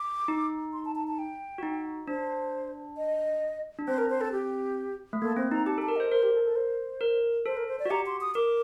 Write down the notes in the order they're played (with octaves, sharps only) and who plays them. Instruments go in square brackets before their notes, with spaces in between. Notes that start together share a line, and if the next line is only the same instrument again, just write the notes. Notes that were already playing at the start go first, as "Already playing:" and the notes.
Already playing: [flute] D6
[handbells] D#4
[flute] C6
A5
A5
A5
G5
[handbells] F#4
D#4
[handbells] D4 [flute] C5
[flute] D#5
[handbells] D4
[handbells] C4 [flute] C5
[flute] A#4
C5
A4
G4
[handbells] A3
[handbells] A#3 [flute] A4
[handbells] C4 [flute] C5
[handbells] D#4 [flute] A#5
[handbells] G4 [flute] A5
[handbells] A4
[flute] A5
[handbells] A#4
[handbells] C5 [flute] D#5
[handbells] A#4 [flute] C5
[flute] G4
A4
A4
C5
[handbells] A#4
[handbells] A4 [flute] C5
[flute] A#4
C5
D5
[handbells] F#4
[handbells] G4 [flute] A#5
[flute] C6
D#6
[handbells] A#4 [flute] D6